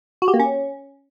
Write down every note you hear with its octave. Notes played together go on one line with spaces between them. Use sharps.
F#4
G4
A#3
C#4